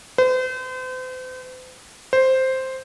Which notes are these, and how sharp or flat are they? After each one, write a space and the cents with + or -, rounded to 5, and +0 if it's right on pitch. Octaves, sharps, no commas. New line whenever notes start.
C5 -40
C5 +0